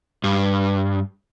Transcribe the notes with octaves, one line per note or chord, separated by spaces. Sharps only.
G2